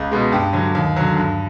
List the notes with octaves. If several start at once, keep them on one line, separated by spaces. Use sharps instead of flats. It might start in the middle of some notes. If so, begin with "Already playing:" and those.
Already playing: C#2
B2 G#3
G2 G4
D3 F#3
D#2
D3 F#3
G2